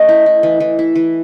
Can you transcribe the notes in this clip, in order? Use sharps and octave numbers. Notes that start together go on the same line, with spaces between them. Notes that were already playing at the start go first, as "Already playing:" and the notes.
Already playing: A3 C#4 D#5
E4
E4
E3
E3
E4
E3